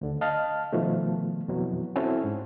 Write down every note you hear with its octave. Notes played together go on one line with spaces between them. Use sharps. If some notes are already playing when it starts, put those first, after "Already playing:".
D2 D3
D#5 F5 A5 F6
B2 D#3 F3 A3
F2 B2 E3 F#3
C4 C#4 E4 F#4 A4 C5
G#2